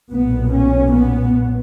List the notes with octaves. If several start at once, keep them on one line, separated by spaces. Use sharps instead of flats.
B1 A#2 B3
C#4
B3